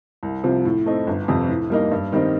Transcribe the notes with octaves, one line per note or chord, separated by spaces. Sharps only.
C2
C3 F3
A2
A3 C4 D#4
G1
F2 C3
A2
G3 A#3 D#4
G2
D#3 G3 C4 D#4